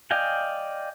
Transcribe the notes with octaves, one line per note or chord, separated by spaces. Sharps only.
D5 D#5 F5 G5 G#5